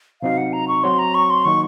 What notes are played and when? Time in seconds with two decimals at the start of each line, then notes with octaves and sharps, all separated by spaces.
0.22 C3 F#3 C4 D#4 F#4 F5
0.38 F#5
0.53 A#5
0.68 C#6
0.83 F#3 C4 F#4 C#5 C6
0.99 A#5
1.15 C#6
1.30 C6
1.45 D#3 F#3 A#3 D#4 C#6